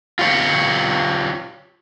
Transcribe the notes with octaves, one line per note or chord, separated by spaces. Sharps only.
F4 G4 C#5